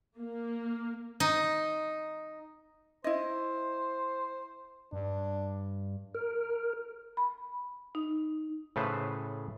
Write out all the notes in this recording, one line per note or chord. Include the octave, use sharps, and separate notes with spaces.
A#3
D#4
E4 C5 D#5
G2 D4
A#4
B5
D#4
A2 C#3 A4 B4 C5